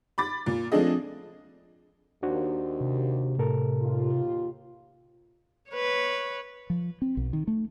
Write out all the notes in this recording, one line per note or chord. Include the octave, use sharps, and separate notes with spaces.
B5 D6 A6
A#2
F3 A3 C4 D4 G#4 D#5
D#2 D4 F#4 C5
C3
A2 A4 A#4
D#2 F4
B4 C#5
F3
C4
B1
D#3
A3